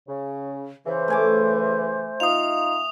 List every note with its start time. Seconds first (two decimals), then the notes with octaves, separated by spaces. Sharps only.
0.08 C#3
0.86 C#3 E3 C5
1.08 A3 G#5 D6
2.20 D#4 F4 D#6 F7